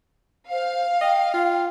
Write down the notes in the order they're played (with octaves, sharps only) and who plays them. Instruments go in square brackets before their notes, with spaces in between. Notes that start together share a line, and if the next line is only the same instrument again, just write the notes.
[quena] C5 [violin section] F5
[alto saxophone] D#5 [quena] G5
[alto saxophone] F4